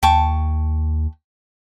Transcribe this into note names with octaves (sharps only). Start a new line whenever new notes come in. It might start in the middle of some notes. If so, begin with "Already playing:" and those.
D#2 G5 A5 C#6